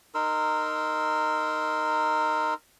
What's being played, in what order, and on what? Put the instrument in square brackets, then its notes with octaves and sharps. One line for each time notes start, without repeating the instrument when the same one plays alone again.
[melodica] D#4 A#4 C6 E6